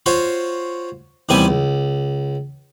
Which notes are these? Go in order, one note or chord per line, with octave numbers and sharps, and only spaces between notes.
F4 F#4 C5 C#5
D#2 C3 E3 G3 B3 G#5
C#2